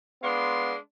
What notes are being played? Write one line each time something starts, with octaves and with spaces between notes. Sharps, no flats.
G#3 B3 D4 F5 C6